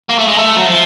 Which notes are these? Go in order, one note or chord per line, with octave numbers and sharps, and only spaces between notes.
A#3
A3
G#3
A3
F#3
F3